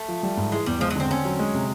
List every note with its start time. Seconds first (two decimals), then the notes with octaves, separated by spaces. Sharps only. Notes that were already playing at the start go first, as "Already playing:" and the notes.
Already playing: A3
0.08 F3
0.23 G3
0.37 G#2
0.52 E3 G#3
0.66 E2 G3
0.80 F3 G#3
0.90 F#3
0.96 D3 C4
1.11 C4 C#4
1.25 F#3
1.39 G#3
1.54 C3